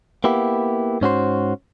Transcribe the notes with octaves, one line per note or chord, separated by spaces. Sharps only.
A#3 B3 E4 G4
G#2 C#4 F#4 C5